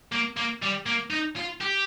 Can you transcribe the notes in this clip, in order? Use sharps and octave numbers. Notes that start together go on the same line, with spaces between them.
A#3
A#3
G3
A#3
D#4
F4
G4